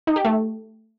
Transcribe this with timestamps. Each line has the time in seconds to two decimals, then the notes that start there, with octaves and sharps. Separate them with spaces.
0.07 D#4
0.16 G4
0.25 A3